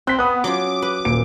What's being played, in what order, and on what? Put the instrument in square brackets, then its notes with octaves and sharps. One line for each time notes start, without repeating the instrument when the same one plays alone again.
[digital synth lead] C4 [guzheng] G5 [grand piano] F#6 B6
[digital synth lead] B3 [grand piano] D#6 F#6
[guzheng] F#3 C#4 F4 [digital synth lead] D6
[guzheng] B4
[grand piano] D#1 A#2 D7